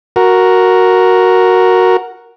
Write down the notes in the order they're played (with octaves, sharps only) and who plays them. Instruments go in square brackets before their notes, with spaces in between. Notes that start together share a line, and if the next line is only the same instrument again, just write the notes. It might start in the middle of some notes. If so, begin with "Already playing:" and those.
[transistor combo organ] F#4 A#4